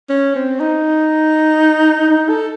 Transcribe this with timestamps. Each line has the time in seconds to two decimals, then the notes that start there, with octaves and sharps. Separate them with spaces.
0.09 C#4
0.35 C4
0.60 D#4
2.10 D#4
2.29 A4